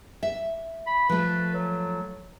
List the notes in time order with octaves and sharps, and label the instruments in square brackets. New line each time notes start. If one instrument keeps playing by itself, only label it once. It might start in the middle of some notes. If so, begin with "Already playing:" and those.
[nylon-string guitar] E5
[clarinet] B5
[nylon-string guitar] F3 A3 [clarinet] B4
[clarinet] F#3